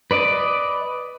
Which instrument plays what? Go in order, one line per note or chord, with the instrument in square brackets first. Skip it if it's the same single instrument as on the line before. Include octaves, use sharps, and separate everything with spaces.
[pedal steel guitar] B4 D5 D#5 D6